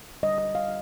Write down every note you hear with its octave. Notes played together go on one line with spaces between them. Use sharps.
D3 G3 D4 D#5
D#5
F5